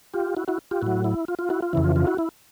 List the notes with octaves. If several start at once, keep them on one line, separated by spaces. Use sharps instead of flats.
F4 G4
E4 F#4
E4 F#4
F4 G4
A2 F#3 E4 F#4
E4
F4
F4
E4 F#4
F4
F2 C#3 E3 E4
F4
F4
E4 F#4
E4